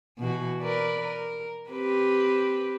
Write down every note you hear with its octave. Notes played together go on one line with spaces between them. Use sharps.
B2 E3 F#4
A#4 B4 D5
A#4
C4 G4 B4